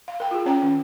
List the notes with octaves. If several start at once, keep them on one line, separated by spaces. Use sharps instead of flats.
F5
A#4 G5
F4 G#4
C#4 C#5 G5 A#5
D#3 C#4